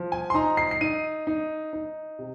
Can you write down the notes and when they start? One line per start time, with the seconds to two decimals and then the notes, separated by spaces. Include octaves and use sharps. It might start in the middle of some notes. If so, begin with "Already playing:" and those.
Already playing: F3
0.12 G#5
0.30 C6
0.34 D#4 A#5
0.57 C7
0.71 C7
0.81 D#4 D#7
1.27 D#4
1.73 D#4
2.19 C3